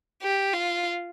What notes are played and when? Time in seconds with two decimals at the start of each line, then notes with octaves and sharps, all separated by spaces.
0.22 G4
0.54 F4